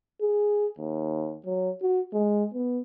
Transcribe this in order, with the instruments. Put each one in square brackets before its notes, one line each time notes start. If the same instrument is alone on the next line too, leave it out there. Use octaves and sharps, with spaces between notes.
[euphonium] G#4
D#2
F#3
F#4
G#3
B3